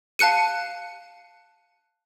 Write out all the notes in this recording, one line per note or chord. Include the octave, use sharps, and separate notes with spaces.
F5 A5 F#6 C#7 D#7